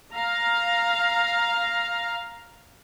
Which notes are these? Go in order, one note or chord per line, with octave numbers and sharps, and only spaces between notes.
F5 A#5